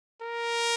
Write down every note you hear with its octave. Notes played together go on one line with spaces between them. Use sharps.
A#4